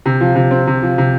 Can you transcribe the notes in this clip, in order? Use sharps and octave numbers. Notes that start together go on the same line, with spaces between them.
C3
F3
C3
C4
C3
F3
C3